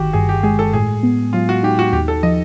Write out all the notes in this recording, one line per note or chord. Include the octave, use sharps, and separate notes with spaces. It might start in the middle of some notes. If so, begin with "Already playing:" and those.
Already playing: G1 D#3 F#4 G4
G2 G#4
G4
G#3 G#4
A4
A2 G#4
B3
F#3 F4
F#4
D#4 G4
F#4
D#2 G4
A4
F3 D#5